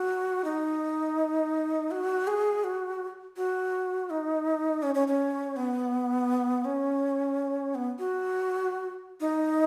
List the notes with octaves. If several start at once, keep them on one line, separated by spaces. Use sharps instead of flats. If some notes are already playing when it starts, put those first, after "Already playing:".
Already playing: F#4
D#4
F#4
G#4
F#4
F#4
D#4
C#4
C#4
C#4
B3
C#4
B3
F#4
D#4